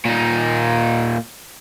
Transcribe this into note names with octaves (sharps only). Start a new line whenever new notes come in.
A#2 D#4